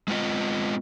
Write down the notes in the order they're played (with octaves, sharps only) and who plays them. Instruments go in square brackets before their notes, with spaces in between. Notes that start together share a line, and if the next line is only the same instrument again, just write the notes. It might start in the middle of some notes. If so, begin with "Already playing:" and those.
[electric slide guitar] G#3 B3 C4 F4 D#5